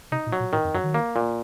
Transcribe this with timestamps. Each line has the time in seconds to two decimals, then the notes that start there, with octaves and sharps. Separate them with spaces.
0.12 C3 D#4
0.26 A#2
0.33 F#3
0.40 A#2
0.53 A2 D#3
0.64 F2
0.74 F#2 F#3
0.84 D#3
0.94 A#3
1.16 A#2